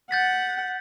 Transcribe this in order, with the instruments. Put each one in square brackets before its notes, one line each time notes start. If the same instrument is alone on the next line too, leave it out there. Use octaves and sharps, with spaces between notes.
[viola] F#5 [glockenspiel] G6 A6 B6